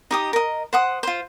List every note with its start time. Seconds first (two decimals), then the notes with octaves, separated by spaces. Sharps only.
0.11 D#4 G4 D#6
0.33 A#4 D#5
0.73 C5 F#5 D#6
1.03 F4 C5